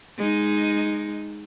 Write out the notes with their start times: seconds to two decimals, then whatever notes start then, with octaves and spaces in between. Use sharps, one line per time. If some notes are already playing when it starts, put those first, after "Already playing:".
0.18 G#3 D#4